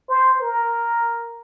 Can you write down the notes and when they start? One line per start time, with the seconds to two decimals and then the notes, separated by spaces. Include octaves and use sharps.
0.08 C5
0.41 A#4